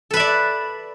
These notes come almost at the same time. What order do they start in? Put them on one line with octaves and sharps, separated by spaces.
A4 B4 E5 D5